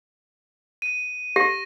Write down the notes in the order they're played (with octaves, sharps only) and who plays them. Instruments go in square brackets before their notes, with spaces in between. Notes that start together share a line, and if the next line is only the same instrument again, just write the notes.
[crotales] D#7
[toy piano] G4 [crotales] A#6